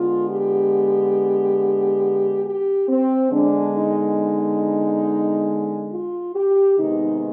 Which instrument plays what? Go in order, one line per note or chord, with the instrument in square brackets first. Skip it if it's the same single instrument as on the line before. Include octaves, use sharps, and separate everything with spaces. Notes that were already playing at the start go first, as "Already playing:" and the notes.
Already playing: [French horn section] D3 G#3 B3 F4
G4
G4
C4
D3 G#3 B3 D4
D#4
F4
G4
C3 D#3 G#3 B3 D#4